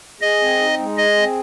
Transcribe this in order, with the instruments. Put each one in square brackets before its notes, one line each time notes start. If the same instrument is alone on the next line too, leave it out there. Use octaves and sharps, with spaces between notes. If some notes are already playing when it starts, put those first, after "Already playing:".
[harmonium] G#4 [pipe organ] D#5
[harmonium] C4
D#4
G#3
[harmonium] G#4 [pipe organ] D#5
[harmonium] C4